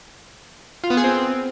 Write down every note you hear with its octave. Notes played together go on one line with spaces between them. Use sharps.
F4
B3
G#4
C4